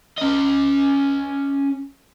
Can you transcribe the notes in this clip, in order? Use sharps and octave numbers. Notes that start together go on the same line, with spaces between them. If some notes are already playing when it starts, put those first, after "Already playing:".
C#4 D#5